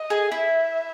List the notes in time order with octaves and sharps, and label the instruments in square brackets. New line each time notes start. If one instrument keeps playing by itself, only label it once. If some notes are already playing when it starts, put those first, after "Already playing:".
Already playing: [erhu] D#5
[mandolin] G#4
[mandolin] E4 [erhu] E5